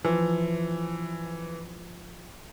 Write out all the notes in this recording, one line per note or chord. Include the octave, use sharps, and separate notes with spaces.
E3 F3